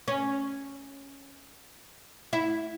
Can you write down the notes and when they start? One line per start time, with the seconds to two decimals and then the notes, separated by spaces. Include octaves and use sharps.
0.08 C#4
2.33 E4